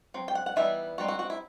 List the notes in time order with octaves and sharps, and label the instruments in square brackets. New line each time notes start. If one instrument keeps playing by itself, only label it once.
[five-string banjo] F#3 C4
G5
F#5
F#5
E3 G3 B3 D#4 E5
G3 C4 D#4 F#4
F#4
F#4
E4